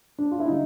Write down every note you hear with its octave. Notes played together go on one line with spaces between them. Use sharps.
D4
F4
E4
D3 G3 D#4